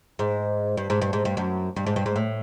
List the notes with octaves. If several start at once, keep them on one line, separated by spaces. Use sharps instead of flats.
G#2
G2
G#2
G2
G#2
G2
F#2
G2
G#2
G2
G#2
A2